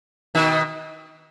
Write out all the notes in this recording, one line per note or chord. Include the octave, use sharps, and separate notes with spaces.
B2 D#3